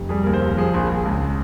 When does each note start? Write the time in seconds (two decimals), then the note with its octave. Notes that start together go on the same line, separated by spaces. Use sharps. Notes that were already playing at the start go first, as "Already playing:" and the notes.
Already playing: F1
0.09 G3 G#4
0.22 A#4
0.26 D#2
0.34 C5
0.41 D#2 A#4
0.57 F3 G#4
0.74 A#1
0.90 A#1
1.05 C#2